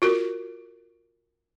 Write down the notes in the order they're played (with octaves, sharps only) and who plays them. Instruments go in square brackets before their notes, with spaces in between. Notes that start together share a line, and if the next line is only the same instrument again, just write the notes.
[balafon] F4 F#4 A#4